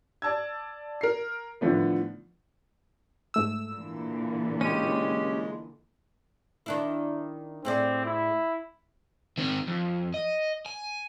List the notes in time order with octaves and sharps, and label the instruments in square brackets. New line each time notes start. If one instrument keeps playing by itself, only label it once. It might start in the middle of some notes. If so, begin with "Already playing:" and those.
[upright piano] D5 A5 E6 G#6
A#4 C7
A2 D3 D#3 F3 A3 B3
[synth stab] G#2 A3 E6
[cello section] A#2 D3 E3
[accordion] G#3 [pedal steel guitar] C#4 G4 [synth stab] D#7
[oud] D#3 D4 E4
[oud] A2 G#4 D5 [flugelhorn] C4
[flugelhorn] E4
[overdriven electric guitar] D#3 C4
F2
D#5
G#5